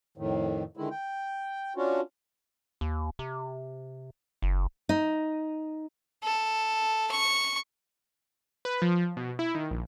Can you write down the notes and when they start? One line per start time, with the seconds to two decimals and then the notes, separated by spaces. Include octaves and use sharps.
0.18 F2 A2 D#3
0.77 D3 D#3 G#3 E4
0.91 G5
1.77 C#4 D4 F4 F#4
2.81 D#2
3.19 C3
4.42 F#1
4.89 D#4
6.23 A4
7.11 C#6
8.65 B4
8.82 F3
9.17 B2
9.39 E4
9.55 D#3
9.71 A#1